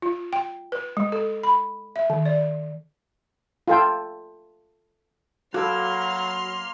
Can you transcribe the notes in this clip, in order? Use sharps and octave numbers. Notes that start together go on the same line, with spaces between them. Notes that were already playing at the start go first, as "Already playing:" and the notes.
F4
G5
B4
G#3
A4
B5
E5
D#3
D5
F4 A4 G5
F#3 A#3 F#4 A4 B4 C6 F6